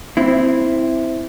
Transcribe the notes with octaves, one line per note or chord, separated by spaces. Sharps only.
C4 E4